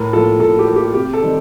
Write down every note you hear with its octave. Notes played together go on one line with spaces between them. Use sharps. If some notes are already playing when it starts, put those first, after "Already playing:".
Already playing: A2 A#4
F3 A#3 A4
A2 A4
G4
F3 A#3
G4
C3 G4
A4
D#3 G3 C4